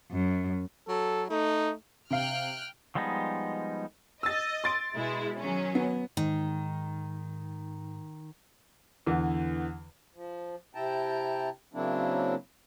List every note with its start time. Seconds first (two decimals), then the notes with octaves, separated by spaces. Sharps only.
0.12 F#2
0.88 F#3 A4
1.30 A3 D#4
2.11 C3 F5 G5 F6 F#6
2.95 F3 G3 G#3 B3 D#4
4.23 D#5 E6 A6
4.64 C6 A6 D7
4.94 B2 G#3 E4
5.38 D#3 F#3 C#4
5.75 B3
6.17 G#2 D#3
9.07 E2 D3 E3
10.15 F3
10.75 C3 E4 G5 A5 A#5
11.73 C#3 F#3 A#3 C4 D4 E4